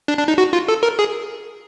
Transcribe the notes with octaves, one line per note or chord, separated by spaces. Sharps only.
D4
D4
D#4
F#4
F4
A4
A#4
G#4